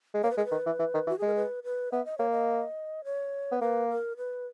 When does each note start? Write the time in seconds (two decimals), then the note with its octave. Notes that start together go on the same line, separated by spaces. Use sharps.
0.14 G#3
0.23 A#3 C#5
0.30 B4
0.37 G#3 A#4
0.45 B4
0.52 D#3
0.66 E3
0.79 E3
0.94 D#3
1.07 E3 F#4
1.18 G#4
1.22 G#3 A#4
1.35 B4
1.64 B4
1.92 B3 E5
2.05 D#5
2.18 A#3 C#5
2.31 D#5
3.05 C#5
3.52 B3
3.60 A#3 B4
3.89 A#4
4.17 B4